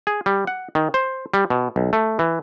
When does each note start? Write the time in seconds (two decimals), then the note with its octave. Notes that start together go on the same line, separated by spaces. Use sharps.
0.07 G#4
0.26 G3
0.47 F#5
0.75 D#3
0.94 C5
1.34 G3
1.50 B2
1.76 B1
1.93 A3
2.19 E3